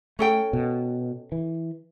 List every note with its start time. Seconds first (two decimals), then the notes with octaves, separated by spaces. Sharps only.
0.19 A3 C#4 A4 G5
0.53 B2
1.32 E3